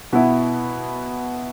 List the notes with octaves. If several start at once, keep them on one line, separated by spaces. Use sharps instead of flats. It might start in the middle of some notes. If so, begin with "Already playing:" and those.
B2 B3 E4